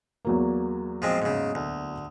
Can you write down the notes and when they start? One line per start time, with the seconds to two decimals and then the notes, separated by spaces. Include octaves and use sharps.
0.25 E2 F#3 A#3
1.02 F3 G#3 C4
1.22 G#2 C#3
1.55 D2